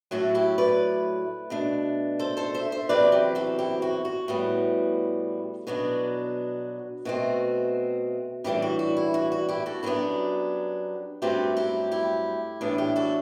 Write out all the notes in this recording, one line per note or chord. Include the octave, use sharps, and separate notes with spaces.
A2 F#3 A3 F#4 A4
E4 G4
B4 D5
B2 A3 D4
A4 C5
A4 C5
C5 E5
C5 E5
E2 C3 F#3 C4 B4 D5
G4 B4
F#4 A4
E4 G4
F#4
F#4
A2 G3 B3
B2 F#3 B3 D4 F#4
B2 A3 C4 F#4
A2 E3 G3 D4 E4 G4
F#4
F#4
E4
F#4
F#4
E4 G4
F#4 A4
F#2 F#3 B3 D4 E4 G4
G2 F#3 A3 C4 G4 B4
E4 G4
E4 G4
A2 E3 B3 D4
E4 G4
F#4 A4